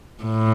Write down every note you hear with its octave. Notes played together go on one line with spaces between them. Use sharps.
A2